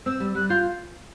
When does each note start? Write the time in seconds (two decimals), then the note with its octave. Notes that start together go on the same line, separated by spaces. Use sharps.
0.06 C4 E6
0.20 G3
0.35 G3 F#6
0.49 F4 G6